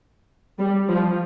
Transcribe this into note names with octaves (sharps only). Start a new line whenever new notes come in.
G3
F3